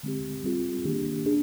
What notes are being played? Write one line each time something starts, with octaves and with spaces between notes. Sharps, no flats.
D3 G#3 C4 G4
G3 C4 F4 G#4
D#3 A#3 D4 G4
D4 G#4